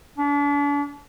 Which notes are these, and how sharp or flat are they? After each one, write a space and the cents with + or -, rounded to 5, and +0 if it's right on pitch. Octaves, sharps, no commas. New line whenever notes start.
D4 -40